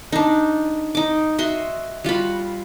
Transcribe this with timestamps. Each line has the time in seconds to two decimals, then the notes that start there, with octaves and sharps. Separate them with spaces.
0.12 D4 D#4
0.95 D#4 D6
1.38 F#4 D#5 E5 C6
2.04 G3 F4 F#4 B5